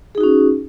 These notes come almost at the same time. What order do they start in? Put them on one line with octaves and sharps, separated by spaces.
G#4 D#4 F#4 C#4